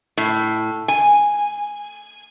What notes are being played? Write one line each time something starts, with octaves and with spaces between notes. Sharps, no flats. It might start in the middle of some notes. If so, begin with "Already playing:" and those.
A2
G#5